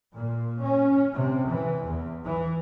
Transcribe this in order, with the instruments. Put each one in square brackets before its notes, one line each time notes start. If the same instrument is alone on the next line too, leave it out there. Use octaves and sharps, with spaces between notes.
[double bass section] A#2
C#4
C3
E3
E2
E3